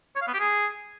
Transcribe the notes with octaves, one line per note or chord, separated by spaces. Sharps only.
C#5
F5
B3
G4
G#4